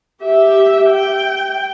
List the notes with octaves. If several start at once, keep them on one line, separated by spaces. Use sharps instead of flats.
G4 E5
G5